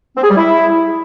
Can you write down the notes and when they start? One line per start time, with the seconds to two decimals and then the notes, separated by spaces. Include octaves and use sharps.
0.17 C4
0.23 G#4
0.30 G3
0.37 E4